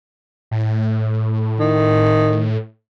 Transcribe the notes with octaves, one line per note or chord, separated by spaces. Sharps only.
A2
D#3